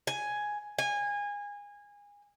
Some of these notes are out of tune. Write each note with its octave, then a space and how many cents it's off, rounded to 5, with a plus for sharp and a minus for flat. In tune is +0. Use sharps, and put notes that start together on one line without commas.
G#5 +5
G#5 -25